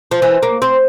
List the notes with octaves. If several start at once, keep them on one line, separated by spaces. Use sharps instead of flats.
F3
E3
A#3
C4